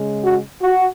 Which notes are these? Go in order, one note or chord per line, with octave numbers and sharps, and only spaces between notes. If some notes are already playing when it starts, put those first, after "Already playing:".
Already playing: C#3 G#3
F#4
F#4